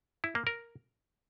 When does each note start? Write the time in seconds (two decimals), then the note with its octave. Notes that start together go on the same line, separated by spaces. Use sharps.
0.24 E4
0.35 A#3
0.47 A#4